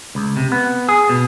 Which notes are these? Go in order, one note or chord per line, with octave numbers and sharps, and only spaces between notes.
C#2
C3
B3
G#4
B2